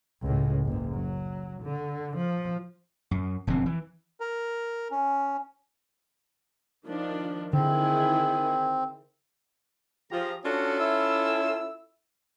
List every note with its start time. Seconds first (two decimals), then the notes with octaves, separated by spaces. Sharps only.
0.22 C#2 A2
0.65 F#1 F#2
0.96 F#3
1.63 D3
2.17 F3
3.11 F#2
3.47 E1 F2 D3 C4
3.66 E3
4.20 A#4
4.91 C#4
6.86 D#3 F3 D4
7.53 D3 D#3 C4 E4 G#4
10.11 F3 G4 G#4 A#5
10.44 C#4 D4 F4 F#4 A4
10.79 E4 E6